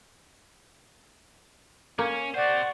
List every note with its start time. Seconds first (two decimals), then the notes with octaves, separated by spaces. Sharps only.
1.99 A#3 C#4
2.34 G4 C5 D5 F#5 C#6